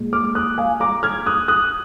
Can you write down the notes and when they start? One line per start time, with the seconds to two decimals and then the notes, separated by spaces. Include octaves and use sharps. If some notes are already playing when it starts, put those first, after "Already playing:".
Already playing: A#2 G#3
0.13 D6 F6
0.35 D#6 F#6
0.58 F5 G#5
0.80 A#5 D6
1.03 F6 G#6
1.26 D#6 F#6
1.48 D#6 F#6